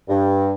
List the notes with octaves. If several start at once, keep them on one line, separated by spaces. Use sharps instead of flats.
G2